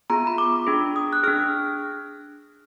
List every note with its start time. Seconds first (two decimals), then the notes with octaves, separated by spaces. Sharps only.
0.10 B3 F4 G#4 A#5
0.27 B5
0.38 D6
0.67 D4 G#4
0.96 D#6
1.13 F#6
1.23 D4 G#4 F6